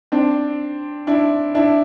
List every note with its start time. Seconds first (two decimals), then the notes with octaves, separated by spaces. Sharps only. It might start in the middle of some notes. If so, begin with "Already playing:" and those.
0.12 C4 D4
1.07 D4 E4
1.55 D4 E4